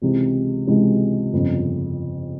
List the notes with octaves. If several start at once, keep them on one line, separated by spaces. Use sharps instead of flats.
C#2 C3 E3 G#3
C#2 C3 E3 G#3
G1 F2 C#3